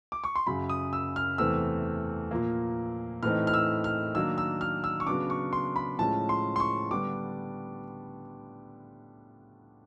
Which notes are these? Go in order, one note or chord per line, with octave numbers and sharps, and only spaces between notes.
D6
C#6
C6
F#2 C#3 F#3 B5
D#6
E6
F6
E2 C3 E3 A3 C4 E6
A#2 F3 A#3
A2 E3 A3 C4 D#4 F6
F6
E6
F6
D#3 F#3 A#3 D4 E6
E6
F6
E6
C#6
C#3 F#3 B3 D4 D6
C#6
C6
B5
A2 F3 G#3 C#4 A5
C6
C6
C#6
D3 G3 B3 D4 D6